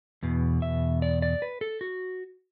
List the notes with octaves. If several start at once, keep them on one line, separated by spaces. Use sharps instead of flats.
E2 B2
E5
D5
D5
B4
A4
F#4